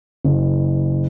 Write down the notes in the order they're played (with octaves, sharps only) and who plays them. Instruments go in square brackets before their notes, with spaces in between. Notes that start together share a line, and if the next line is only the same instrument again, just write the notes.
[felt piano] F#1